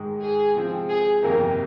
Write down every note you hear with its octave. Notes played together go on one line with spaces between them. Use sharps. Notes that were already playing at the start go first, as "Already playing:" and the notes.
Already playing: G#2 D#3 G#3
G#4
C3 F3 G#3 C4
G#4
G1 F2 C3 D#3 A#3 A#4